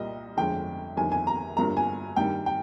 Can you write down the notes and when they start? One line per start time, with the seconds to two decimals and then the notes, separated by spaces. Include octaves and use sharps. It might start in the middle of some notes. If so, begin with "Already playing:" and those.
Already playing: C2 A#2 G3 A#3 D#5
0.37 G1 F2 D3 G#3 G5
0.97 G1 F2 D#3 G#5
1.12 G#5
1.27 A#5
1.57 G1 G2 F3 A#3 A#5
1.77 G#5
2.16 G2 D#3 G3 G5
2.46 G5